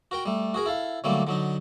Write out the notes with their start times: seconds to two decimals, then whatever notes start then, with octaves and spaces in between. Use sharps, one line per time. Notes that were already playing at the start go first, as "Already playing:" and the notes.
0.11 F#4 A#4 G5
0.26 G3 A3
0.54 F#4 G#4 A#4
0.66 E4 A4 F5
1.04 D3 F#3 G3 A3 A#3
1.27 D3 F#3 D#4